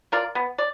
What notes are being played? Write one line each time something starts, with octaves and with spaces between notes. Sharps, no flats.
F4 A#4 D5
B3
D5